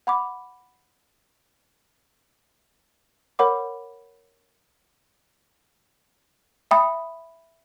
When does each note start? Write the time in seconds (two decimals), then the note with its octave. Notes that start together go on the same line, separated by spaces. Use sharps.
0.07 F#5 B5 D6
3.39 A#4 C#5 F#5 B5 D6
6.71 E5 G5 B5 D#6